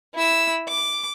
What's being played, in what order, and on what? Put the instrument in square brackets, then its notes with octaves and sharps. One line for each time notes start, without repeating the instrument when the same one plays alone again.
[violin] E4 E6
D6